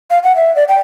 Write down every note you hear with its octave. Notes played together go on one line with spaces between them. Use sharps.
F5
F#5
E5
D5
G5